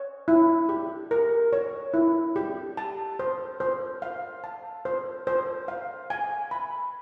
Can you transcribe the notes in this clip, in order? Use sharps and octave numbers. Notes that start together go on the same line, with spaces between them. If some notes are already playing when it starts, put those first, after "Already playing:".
Already playing: C#5
E4
G4
A#4
C#5
E4
G4
A5
C5
C5
F5
A5
C5
C5
F5
G#5
B5